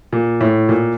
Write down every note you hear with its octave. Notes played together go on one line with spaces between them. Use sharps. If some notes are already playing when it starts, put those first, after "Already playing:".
A#2
A2
A#2